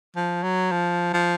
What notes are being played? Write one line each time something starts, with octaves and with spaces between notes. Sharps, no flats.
F3
F#3
F3
F3